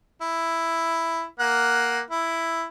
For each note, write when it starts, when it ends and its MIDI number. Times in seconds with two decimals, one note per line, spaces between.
0.22 1.24 64
1.39 2.00 58
1.39 2.00 78
2.11 2.65 64